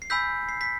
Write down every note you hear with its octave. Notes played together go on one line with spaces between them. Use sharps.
C7
G#5 B5 E6 G6 B6
C7
B6